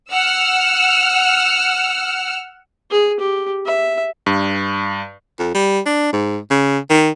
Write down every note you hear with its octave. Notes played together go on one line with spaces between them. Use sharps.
F#5 E6 F6
G#4
G4
E5
G2
F2
G3
D4
G#2
C#3
D#3